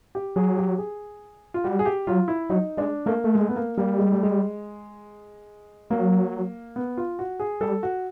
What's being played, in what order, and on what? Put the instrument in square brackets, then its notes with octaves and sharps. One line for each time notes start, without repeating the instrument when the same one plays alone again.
[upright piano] G4
[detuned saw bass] F#3 [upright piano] G#4
[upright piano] G4
G#4
F4
[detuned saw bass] G3 [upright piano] F#4
[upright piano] G#4
G4
[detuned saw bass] F#3 [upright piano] F4
[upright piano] E4
[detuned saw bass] F#3 [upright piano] D#4
[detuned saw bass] G#3 [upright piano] D4
[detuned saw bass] A3 [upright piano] A#3
[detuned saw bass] A3
[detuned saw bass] G#3 [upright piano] A3
[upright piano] B3
A#3
[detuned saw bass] G3 [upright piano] A#3
[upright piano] G#3
A3
G#3
[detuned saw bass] F#3 [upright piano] A#3
[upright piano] B3
F4
F#4
G#4
[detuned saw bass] G3 [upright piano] A4
[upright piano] F#4